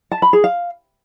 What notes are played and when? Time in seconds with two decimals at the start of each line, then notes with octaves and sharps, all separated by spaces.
0.11 A5
0.22 B5
0.33 G#4
0.44 F5